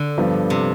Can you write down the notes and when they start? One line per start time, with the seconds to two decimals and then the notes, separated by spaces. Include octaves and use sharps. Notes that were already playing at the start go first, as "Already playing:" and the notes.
Already playing: D3
0.18 G2 F3 B3
0.50 C3